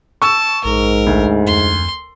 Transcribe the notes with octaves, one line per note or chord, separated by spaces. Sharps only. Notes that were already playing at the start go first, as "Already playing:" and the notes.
A5 C#6 E6
A#1 G#2 A#4
D2
F2 C6